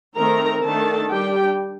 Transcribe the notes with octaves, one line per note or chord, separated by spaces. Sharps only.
D#3 A3 C4 A#4 A#5
D#3 A3 D4 A4 A5
G3 D4 G4 G5